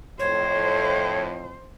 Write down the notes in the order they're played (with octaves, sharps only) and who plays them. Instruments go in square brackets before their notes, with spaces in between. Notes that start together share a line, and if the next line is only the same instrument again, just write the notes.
[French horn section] F2 A2 [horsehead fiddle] C5 [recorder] C#5